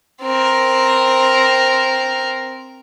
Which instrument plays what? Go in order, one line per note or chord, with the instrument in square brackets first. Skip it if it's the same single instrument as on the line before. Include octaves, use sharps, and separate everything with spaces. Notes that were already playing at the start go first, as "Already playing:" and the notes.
[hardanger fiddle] C4 A#4